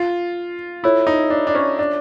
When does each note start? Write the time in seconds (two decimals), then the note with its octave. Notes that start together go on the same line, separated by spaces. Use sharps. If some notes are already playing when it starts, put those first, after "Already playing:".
Already playing: F4
0.83 E4 F4 A4 C#5 E5
1.07 D#4
1.30 D4
1.47 D4
1.55 C#4
1.79 D4